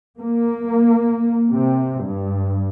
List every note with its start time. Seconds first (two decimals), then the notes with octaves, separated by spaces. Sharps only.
0.19 A#3
1.52 C3
2.02 G2